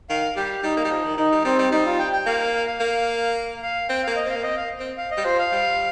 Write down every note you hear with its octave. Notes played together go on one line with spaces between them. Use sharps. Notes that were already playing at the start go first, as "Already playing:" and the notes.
D#3 F5
G3 G4
G3 D#4
A#3
G3
F3
D#3
D#3 D#4
G3
G3 C4
G3
G3 D#4
F4
G5
G5
A#3 F5
F5
F5
F5
A#3
F5
C4 G5
A#3 F5
D#5
C4 F5
A#3
C4 D#5
F5
C4
F5
D#5
G3
F3 C5
F5
G3